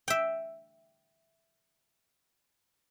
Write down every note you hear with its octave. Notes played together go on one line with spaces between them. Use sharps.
E5 G5